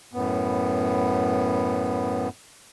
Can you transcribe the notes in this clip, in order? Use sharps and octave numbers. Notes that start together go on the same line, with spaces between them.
F#2 A2 B3